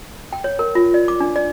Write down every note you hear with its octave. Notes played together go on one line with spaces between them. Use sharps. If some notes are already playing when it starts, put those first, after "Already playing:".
G5
C#5
A#4
F4
D5
D6
D4
D5